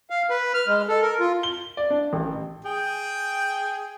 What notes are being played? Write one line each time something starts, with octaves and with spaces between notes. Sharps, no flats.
F5
B4
F6
G#3
A4
A#4
F4
G7
D5
D4
A1
G#4 G5